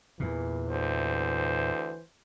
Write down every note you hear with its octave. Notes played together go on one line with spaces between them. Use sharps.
E2 A#2 E3
D2 C5